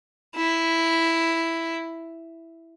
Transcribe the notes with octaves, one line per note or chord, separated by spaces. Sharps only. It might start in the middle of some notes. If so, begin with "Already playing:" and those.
E4